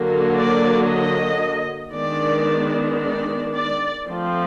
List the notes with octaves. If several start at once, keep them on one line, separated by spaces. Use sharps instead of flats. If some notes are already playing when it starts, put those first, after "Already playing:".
Already playing: D3 F#3 A#3
D5
D#5
D#3 G#3 B3 D4 D5
D5
D5
F3 A3 C4